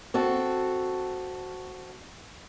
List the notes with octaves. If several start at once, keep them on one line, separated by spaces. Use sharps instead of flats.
C4 F#4 A4